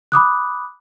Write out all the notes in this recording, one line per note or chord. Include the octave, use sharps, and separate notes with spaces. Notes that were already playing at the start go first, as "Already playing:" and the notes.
B5 D6 D#6 F#6